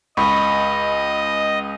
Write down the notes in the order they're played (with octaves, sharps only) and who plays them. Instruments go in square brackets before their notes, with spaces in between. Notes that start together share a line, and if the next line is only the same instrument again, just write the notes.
[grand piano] C#2 [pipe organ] D#5 [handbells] B5 C#6